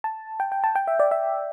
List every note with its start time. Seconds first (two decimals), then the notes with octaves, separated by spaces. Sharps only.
0.04 A5
0.40 G5
0.52 G5
0.64 A5
0.75 G5
0.87 E5
1.00 D5
1.11 E5